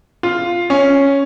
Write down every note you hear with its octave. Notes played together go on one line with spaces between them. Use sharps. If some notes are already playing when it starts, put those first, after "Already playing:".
F4
C#4